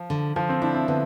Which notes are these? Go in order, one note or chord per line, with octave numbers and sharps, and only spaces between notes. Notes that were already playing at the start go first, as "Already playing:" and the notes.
Already playing: F3
D3
D3 F3
C4
D4 E4
C4
D3 B3